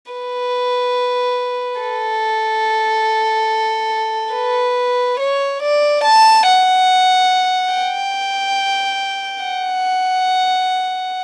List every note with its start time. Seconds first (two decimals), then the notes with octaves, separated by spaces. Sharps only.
0.12 B4
1.81 A4
4.34 B4
5.20 C#5
5.63 D5
6.04 A5
6.47 F#5
7.73 G5
9.44 F#5